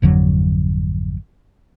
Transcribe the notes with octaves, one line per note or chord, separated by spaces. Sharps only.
G#1 F2 D3 F#3